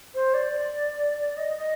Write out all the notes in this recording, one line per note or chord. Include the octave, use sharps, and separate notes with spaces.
C5
D5
D#5
D#5